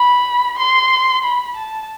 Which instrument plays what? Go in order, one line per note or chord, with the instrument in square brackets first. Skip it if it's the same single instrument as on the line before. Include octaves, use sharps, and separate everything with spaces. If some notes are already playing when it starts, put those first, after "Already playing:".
Already playing: [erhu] B5
C6
B5
A5